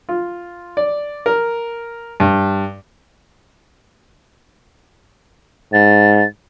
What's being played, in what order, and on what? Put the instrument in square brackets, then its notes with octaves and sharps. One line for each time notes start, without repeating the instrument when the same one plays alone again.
[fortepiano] F4
D5
A#4
G2
[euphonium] G#2 [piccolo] A6